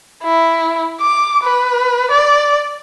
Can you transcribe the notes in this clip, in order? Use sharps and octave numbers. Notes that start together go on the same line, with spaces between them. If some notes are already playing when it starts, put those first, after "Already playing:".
E4
D6
B4
D5